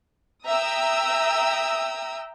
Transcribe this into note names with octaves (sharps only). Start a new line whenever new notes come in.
E5 G5 A#5 D#6 E6